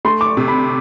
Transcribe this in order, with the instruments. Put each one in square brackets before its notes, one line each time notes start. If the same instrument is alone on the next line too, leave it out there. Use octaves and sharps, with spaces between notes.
[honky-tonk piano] A3 [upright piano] C6
[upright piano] D6
C#6
[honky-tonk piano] C3
[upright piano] B5